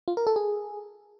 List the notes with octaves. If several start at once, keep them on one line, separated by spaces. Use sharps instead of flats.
F4
A#4
A4
G#4